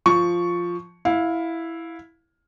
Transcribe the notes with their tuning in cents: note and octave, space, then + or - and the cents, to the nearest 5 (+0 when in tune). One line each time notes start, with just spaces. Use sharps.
F3 +0 C#6 +5
E4 +0 F5 +15